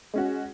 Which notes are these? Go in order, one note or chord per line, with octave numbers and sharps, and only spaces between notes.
G#3 C#4 F#4